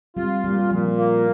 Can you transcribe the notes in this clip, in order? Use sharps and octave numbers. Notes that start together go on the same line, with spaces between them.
G3 C4 F4
A#2 G3
G3
A#2 F3
A#3